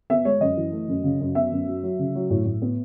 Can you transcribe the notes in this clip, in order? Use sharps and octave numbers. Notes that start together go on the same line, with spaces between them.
B3 E5
G#3 C#5
F#2 D#5
E3
A3
F#2
C#3
F#2
B3 E5
F#2
F#3
F#3
C#3
F#3
A2
A2
B3